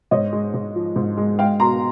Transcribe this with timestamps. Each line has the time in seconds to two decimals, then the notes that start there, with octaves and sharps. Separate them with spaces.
0.11 G#2 C#5 D#5
0.33 G#3
0.54 G#2
0.75 F3
0.96 G#2
1.17 G#3
1.39 G#3 F5 G5
1.60 B2 A#5 C6